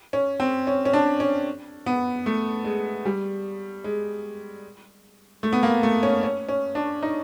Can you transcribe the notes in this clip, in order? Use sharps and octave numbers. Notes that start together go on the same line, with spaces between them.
C#4
C4
C#4
C#4
D4
C#4
B3
A3
G#3
G3
G#3
A3
B3
A#3
A3
C#4
C#4
C#4
D4
D#4